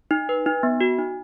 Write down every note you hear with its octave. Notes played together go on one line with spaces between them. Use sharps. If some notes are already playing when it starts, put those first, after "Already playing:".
D#4
B4
D#4
B3
F#4
D#4